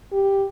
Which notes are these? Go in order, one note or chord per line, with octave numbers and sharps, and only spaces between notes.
G4